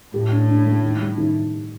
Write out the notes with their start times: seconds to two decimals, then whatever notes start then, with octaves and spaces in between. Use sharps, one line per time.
0.14 A2 G4
0.31 D4
0.49 D4
0.65 A3
0.83 D#3
1.00 G3
1.18 D#3